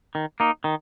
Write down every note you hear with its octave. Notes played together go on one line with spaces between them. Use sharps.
D#3
A#3 D#4
D#3